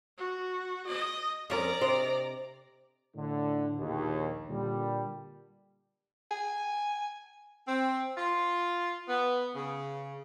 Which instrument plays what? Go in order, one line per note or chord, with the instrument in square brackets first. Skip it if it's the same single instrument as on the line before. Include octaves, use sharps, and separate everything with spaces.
[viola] F#4
D#5
[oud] F2 C#4 A#4 [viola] D5 A#5
[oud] C3 C5 D#5
[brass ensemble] A2 D3
A#1 D#2
A#2 D3 G3
[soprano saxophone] G#5
[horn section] C4
F4
B3
C#3